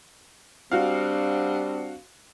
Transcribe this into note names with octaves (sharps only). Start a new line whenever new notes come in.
G3 C4 D4 F#4 F5